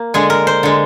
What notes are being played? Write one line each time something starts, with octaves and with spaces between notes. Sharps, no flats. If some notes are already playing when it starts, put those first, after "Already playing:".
Already playing: A#3
D3 G#3 G#4
A#4
C5
D3 G#3